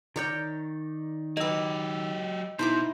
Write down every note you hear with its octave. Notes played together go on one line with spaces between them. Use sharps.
D#3 A#4 C#5 D5 G5 G6
F#3 G4 A#4 B4 D#5 E6
B2 D#4 E4 C5 D6